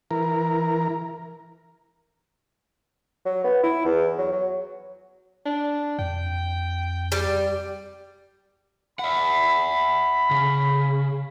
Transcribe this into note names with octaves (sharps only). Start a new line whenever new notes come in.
E3 A#4
F#3
B3
E4
E2
F#3
F#3
D4
F2 G5
G3
E5 F#5 B5
C#3